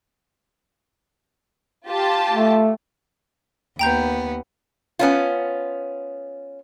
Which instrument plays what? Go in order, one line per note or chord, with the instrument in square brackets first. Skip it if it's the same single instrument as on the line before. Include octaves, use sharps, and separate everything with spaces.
[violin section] F4 G4 A5
[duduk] A3
[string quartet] D#2 B3 [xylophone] G5 A#5 G6
[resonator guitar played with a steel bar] B3 C#4 F4